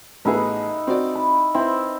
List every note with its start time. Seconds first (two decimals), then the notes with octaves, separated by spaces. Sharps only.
0.25 A1 B3 D#4 E4 G#4 F#5
0.87 C4 F#4 D5
1.15 B5
1.54 C4 E4